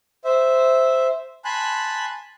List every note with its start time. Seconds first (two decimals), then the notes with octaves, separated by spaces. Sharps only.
0.25 C5 E5
1.45 G#5 A5 B5 C6 F#6